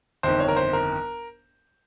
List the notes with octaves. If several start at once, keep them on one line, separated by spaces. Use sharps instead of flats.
G1 F2 D#3 C5
C#5
A#4
C5
A#4